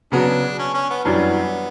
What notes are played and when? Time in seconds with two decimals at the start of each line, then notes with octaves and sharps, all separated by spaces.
0.12 C#3 F#3 B3 D4 F#4
0.59 C#4
0.74 C#4
0.90 B3
1.04 F#2 E3 G3 B3 D4